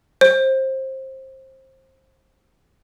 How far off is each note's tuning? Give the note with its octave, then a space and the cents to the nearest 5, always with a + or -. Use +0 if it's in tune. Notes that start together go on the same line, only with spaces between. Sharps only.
C5 +20